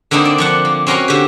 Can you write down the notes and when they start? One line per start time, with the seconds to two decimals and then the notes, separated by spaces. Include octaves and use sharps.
0.11 D3 A#3 C4 D4 D#4
0.25 D5
0.38 F3 D4 F#5
0.65 A#3
0.87 C4 C#4 F#4 A#4 A#5 C6
1.08 D3 G4